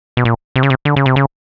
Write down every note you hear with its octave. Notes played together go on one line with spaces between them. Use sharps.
B2
A#2
C3
C#3
C3
D3
C#3
C3
C#3